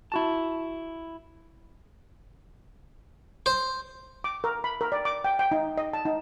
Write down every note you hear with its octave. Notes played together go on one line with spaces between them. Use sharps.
E4 F#4 A5
C5
D6
A#4
B5
A#4
D5
D6
G5
G5
D#4
D#5
A5
D#4